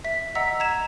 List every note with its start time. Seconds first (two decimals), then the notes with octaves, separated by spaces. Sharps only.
0.04 E5 B6
0.35 D#5 F#5 A#5 E6 B6
0.60 A#5 G#6 E7